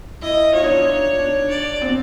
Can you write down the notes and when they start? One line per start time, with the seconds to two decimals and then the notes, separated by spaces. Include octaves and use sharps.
0.22 E4 D#5
0.53 F4 C#5
0.60 D4
0.64 D#4
0.76 D4
1.18 D4
1.50 D5
1.82 C4